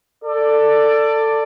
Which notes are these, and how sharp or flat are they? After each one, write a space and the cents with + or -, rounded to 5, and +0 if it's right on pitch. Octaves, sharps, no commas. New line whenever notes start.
A4 +20 D5 +5